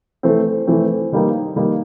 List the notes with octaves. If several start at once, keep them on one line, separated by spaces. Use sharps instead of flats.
E3 A3 C4
E3 A3 C4
D#3 G3 A#3 D#4
D#3 G3 A#3 D#4